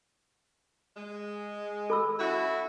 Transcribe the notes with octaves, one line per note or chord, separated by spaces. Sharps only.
G#3
A4 B5 E6
C#4 E4 F#4